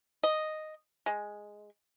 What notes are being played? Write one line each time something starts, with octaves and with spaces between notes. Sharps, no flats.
D#5
G#3